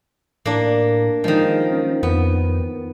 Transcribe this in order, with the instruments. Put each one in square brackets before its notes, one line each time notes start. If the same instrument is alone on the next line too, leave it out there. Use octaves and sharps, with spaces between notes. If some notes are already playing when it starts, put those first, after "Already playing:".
[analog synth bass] A2 [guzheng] A#3 D4
[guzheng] D#3 F3 [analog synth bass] G#3
[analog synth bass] C#4
[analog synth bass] F2 [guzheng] B3